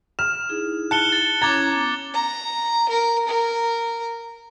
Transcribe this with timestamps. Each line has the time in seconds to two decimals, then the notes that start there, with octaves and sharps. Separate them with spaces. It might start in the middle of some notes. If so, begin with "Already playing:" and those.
0.19 F6 E7
0.49 D#4 E4 G#4
0.91 A5 F#6 C#7 G7
1.12 A6
1.42 C#4 E4 C#5 A#5 D6 G#6 A6
1.74 B3
2.14 A#5
2.89 A#4
3.27 A#4